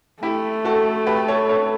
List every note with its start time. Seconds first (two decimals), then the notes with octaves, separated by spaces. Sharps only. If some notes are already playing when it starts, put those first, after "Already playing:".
0.23 A3 E4 G4
0.65 F#4 A4
1.07 G4 B4
1.28 A4 C#5
1.49 A4 C#5